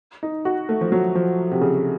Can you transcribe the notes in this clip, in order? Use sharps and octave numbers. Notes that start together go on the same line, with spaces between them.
D#4
F#4
A3
F3
F#3
F3
C3
C#3